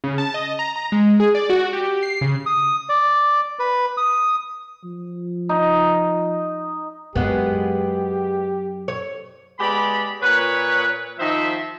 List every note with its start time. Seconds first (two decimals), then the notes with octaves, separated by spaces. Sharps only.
0.04 C#3
0.18 A5
0.34 D#5
0.59 A#5
0.76 A#5
0.92 G#3
1.20 G#4
1.35 D5
1.50 F#4
1.73 G4
2.03 C7
2.21 C#3
2.46 D#6
2.89 D5
3.59 B4
3.97 D#6
4.84 F3
5.49 D#4
7.15 F#2 F#3 G#3 B3 G4
8.88 C#5
9.59 G#3 B3 G4 D5 B5
10.21 A#2 B4 C#5
11.19 D#3 F3 C5 E5